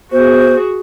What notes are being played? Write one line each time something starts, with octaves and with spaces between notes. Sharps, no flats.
B3 F#4 G#4 C5